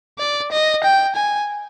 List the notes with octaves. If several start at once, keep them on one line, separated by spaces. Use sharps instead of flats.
D5
D#5
G5
G#5